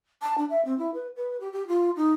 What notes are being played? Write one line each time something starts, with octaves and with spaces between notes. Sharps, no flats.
A5
D4
E5
C4
E4
B4
B4
G4
G4
F4
D#4